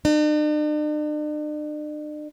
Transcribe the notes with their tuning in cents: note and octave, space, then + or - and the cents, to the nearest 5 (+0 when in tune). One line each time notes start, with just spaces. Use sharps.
D4 +45